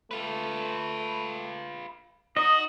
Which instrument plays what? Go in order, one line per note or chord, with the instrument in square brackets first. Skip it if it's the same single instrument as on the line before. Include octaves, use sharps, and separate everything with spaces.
[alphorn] A3 [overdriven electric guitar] F4 B4
[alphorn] D#4 [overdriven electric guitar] F#4 [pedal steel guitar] D#5 [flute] D#6